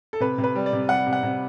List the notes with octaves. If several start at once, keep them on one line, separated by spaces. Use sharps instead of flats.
A4
C3 B4
C3
B4
G3
D5
C3
G3 F#5
C3
F#5
C3